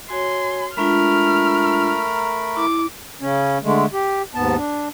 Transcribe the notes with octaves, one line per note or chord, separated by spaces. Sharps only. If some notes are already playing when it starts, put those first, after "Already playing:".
F#4 C#5 G#5 C6
G#3 A3 D4 F4 A#4 B5 F6
A#5
E4 D6
C#3 C#4
D3 G#3 A3
G4
D#2 G#2 B3 A5
D4